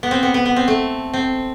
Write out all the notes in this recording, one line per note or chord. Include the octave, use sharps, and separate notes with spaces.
B3
C4
B3
B3
B3
C4
A3
C4